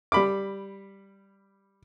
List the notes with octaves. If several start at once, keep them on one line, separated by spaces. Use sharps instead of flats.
G3 B5 D6